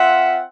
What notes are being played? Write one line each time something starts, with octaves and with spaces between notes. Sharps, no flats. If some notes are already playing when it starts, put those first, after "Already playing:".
Already playing: C4 F4 E5 F#5